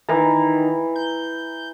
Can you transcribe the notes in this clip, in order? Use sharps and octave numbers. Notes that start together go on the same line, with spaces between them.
D#3 E3 A#5
G6